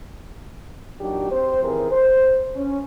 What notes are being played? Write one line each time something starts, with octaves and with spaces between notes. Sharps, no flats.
A#2 F#3 D4 D#4 G4
C4 G4 C5
D#3 E3 C4 G#4 A#4
C5
C#4